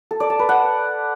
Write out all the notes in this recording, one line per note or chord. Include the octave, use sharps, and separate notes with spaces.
A4
D5
A5
B4
F#5